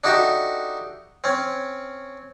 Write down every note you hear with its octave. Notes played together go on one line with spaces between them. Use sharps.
D4 D#4 F#4 G4 A4 E5
C4 C#4